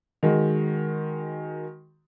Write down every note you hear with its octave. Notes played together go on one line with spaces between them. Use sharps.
D#3 G#3 F#4